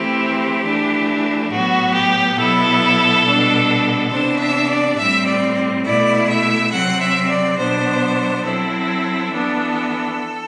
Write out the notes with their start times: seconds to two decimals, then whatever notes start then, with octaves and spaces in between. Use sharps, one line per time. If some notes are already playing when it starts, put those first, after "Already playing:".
Already playing: E3 A3 C4 E4 G4
0.63 E3 A3 D4
1.50 A2 F#3 B3 F#4
1.94 G4
2.37 B2 F#3 B3 E4 A4
3.24 B2 G3 D4
4.10 C3 E3 B3 D4 C5
4.40 E5
4.69 D5
4.97 A2 G3 C4 E5
5.26 D5
5.84 B2 A3 E4 D5
6.28 E5
6.71 C3 F#3 C4 F#5
7.00 E5
7.29 D5
7.57 B2 F#3 B3 D4 C5
8.45 F#3 C4 E4 A4
9.31 E3 B3 D4